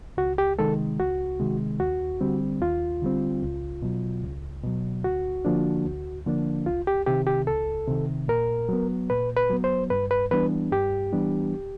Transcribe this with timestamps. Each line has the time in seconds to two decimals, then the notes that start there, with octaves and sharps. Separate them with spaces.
0.17 C#2 F#4
0.38 G4
0.58 C3 D#3 G#3 A4
1.00 C#2 F#4
1.40 C3 D#3 G#3
1.80 D#2 F#4
2.21 D3 G3 C4
2.62 D#2 F4
3.02 D3 G3 C4
3.42 C#2
3.82 B2 F#3
4.23 C#2
4.64 B2 F#3
5.04 D2 F#4
5.45 D3 F3 A#3 D4
5.85 D2
6.26 D3 F3 A#3 D4
6.66 C#2 F4
6.87 G4
7.06 C3 D#3 G4
7.27 G4
7.47 C#2 A4
7.87 C3 D#3
8.28 A#2 A#4
8.69 F#3 B3
9.10 A#2 B4
9.37 B4
9.50 F#3 B3
9.64 C5
9.90 G2 B4
10.11 B4
10.31 E3 G3 B3 D4 B4
10.72 G2 G4
11.12 E3 G3 B3 D4